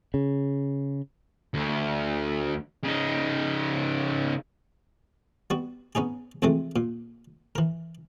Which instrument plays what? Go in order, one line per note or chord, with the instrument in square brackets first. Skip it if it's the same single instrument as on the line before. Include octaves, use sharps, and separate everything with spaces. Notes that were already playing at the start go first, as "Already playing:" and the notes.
[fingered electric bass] C#3
[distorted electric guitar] D2
C#3 D#4
[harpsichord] G3 B3 F#4
B3 C#4 D#4 G#4
F2 C3 E3 G#3 A3
A#2
E3 A#4